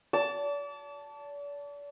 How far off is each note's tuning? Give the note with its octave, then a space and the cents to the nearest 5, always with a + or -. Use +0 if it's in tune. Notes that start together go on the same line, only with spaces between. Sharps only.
D5 -40 A5 +0